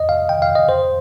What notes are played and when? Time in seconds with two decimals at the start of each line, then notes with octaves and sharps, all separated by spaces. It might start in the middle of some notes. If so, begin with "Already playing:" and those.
Already playing: D#5
0.09 F5
0.29 G5
0.42 F5
0.56 D#5
0.69 C5